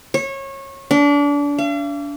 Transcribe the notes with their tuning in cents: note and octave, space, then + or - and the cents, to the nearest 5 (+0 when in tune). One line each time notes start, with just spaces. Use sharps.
C#5 -25
D4 -30
F5 -45